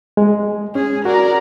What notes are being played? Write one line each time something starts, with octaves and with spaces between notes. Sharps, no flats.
G#3
C#4 G#4
F#4 A#4 D5